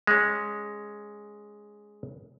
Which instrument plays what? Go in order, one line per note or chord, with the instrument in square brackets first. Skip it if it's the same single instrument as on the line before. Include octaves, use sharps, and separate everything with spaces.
[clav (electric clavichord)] G#3 C#4